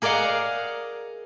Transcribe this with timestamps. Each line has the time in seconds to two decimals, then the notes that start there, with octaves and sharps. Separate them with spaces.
0.02 G#4 A#4 D5 D#5 F5 F#5